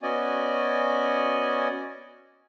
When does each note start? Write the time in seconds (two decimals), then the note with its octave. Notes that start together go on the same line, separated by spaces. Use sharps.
0.03 B3 C#4 F#4 D5 D#5 G#5